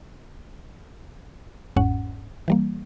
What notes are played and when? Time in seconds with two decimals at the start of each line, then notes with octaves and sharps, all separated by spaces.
1.76 G1 E2 G#2 C#4 F#5
2.48 E3 G3 A#3